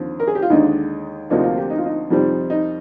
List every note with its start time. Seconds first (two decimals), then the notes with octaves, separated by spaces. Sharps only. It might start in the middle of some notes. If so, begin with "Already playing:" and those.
Already playing: D#2 D3 F3 C4
0.20 A#4
0.27 G#4
0.35 G4
0.42 F4
0.50 D#2 D3 G#3 D4 D#4
1.30 D2 C3 F3 A#3 D4 D#4
1.43 F4
1.57 G4
1.70 D#4
1.78 F4
1.86 D#4
2.10 F2 C3 D#3 G3 C4
2.50 D#4